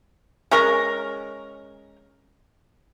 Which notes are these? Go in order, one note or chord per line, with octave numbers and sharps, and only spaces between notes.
G#3 C#4 A#4